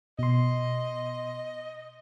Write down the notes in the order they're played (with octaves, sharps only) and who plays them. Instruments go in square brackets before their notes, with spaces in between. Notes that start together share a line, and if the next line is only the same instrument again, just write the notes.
[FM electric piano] B2 C6 [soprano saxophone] D#5